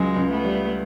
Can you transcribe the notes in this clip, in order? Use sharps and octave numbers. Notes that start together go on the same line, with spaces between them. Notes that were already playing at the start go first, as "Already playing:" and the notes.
Already playing: C#2 F#3 G#3
C#2
A3 B3
G3